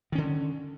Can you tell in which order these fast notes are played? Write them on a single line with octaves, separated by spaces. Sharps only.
D#3 C#4 D3